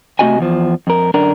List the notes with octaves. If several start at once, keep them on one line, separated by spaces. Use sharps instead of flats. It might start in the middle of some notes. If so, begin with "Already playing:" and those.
C3 A3 C#4 F#4 D#5 G#5
E2 F3
F2 A#4
F#2 D3 D4 A#4